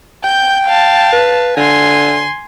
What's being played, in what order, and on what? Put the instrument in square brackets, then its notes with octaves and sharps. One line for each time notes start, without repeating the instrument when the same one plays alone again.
[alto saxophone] G5 [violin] G6
[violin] F5 A5
[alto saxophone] B4
[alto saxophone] D3 [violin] G#5 C6